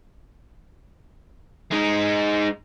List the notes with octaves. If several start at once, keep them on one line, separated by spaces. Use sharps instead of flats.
G#3 D#4